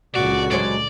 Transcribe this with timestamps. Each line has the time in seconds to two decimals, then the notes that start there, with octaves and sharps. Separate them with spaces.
0.16 C#2 A#2 D3 F#4 D5
0.52 F#3 G#3 C5 D5